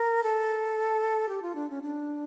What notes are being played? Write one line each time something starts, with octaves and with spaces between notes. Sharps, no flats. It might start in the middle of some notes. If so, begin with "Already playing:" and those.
Already playing: A#4
A4
G4
F4
D4
C#4
D4